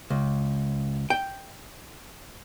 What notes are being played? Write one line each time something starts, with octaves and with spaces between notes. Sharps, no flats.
C#2
G5